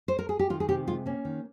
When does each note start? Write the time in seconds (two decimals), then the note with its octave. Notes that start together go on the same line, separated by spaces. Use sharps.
0.08 C5
0.19 A#4
0.29 G#4
0.39 G4
0.50 D#3 F4
0.60 G#4
0.69 C3 G4
0.87 G#3 F4
1.06 A#3 C#4
1.25 D#3